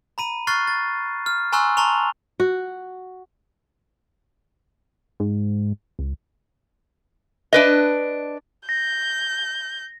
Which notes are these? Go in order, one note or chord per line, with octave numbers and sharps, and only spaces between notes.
A#5 B5 D#7
C#6 F6 F#6 A6 C7
A6
F6
G#5 A#5 C6 C#6 E6 F#6
A5 A#5 C6 C#6 F7
F#4
G#2
C#2
D4 B4 D#5
G6 A#6